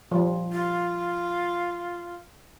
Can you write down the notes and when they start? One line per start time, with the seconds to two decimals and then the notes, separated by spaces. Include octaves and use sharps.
0.11 F3 G3
0.52 F4